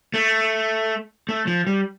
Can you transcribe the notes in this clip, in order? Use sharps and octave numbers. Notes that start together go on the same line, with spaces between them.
A3
A3
F3
G3